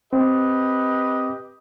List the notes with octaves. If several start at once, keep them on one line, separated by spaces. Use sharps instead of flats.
C4 G4 B4 D#5